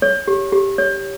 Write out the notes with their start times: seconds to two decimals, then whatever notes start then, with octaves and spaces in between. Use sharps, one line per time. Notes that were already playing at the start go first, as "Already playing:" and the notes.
0.02 C#5
0.28 G4
0.52 G4
0.78 C#5